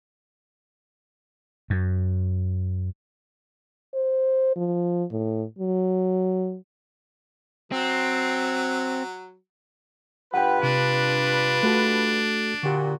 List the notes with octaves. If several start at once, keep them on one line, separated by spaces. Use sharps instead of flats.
F#2
C5
F3
A2
F#3
F#3 C4
G2 F4 B4 F#5 G5
C3 D4
A3 F#4 A4
A#2 D3 F#4 G4